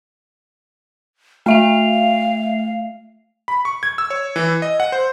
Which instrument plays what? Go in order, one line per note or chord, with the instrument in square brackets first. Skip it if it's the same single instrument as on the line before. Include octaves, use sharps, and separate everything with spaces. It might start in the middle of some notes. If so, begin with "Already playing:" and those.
[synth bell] A3 E5 F7 [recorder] F5
[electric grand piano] B5
C#6
G#6
E6
C#5
E3
D#5
F#5
C5